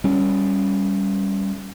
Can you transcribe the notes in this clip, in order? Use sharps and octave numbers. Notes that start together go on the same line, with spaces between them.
G3 C#4